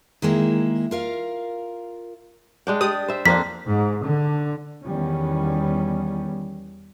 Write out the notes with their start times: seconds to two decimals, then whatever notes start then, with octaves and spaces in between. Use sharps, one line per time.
0.22 D#3 G#3 A#3 E4
0.91 F4 A#4 F5
2.67 G#3 D4 G5
2.81 G4 D5 D#6
3.08 C5 E5
3.26 F2 A#3 C4 D4 B6
3.67 G#2
4.05 D3
4.84 E2 D#3 G3 B3 C#4